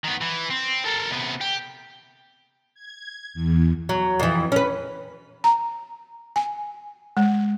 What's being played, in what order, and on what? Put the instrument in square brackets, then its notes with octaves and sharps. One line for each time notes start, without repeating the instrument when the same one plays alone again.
[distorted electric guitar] D#3 B3
E3
C4
A4 A#4
C3 B3
G4
[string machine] G#6
E2
[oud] F#3
F2 E3
C#4 B4
[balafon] A#5
G#5
G#3